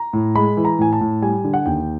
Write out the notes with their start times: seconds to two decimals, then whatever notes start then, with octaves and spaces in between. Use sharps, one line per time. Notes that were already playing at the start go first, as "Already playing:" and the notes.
Already playing: A#5
0.13 A2
0.36 G#3 B5
0.57 E3
0.65 A#5
0.79 A2 G#5
0.93 A5
1.01 A2
1.22 G3 G#5
1.44 D3
1.54 F#5
1.66 D#2 G5